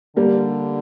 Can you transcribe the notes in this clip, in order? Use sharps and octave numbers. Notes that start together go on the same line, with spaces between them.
D3 G3 A#3